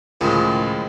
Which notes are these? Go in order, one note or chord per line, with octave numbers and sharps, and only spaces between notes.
C#2 A2 D#3 F3 G#3